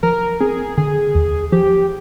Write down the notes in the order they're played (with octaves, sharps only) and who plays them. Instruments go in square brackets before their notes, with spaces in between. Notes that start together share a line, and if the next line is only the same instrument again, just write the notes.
[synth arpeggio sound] F3 [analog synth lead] A#4
[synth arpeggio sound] C4 [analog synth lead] G#4
[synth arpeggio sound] D3 [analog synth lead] G#4
[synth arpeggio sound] D#2
[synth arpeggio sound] F3 [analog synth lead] G4